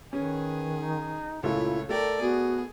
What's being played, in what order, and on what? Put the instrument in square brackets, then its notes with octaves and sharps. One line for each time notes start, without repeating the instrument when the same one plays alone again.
[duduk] D#3 [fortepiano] C#4 [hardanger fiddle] G#4 [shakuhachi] B4
[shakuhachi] D#4
[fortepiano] C#2 A#2 A3 [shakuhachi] E4 [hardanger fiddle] C#5
[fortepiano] A3 [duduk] A4 [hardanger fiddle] A#4 D5 [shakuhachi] G5
[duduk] B3 [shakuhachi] F#4 [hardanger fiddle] G#4